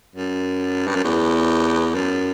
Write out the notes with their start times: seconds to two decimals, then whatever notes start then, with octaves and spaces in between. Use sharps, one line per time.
0.15 F#2
0.87 G2
0.96 F#2
1.05 E2
1.94 F#2